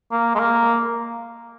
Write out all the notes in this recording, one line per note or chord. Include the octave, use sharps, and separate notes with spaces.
A#3
G#3
A#3